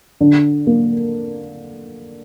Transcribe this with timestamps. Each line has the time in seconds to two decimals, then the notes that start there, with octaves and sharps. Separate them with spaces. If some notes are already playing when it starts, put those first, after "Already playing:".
0.21 D3
0.67 A#3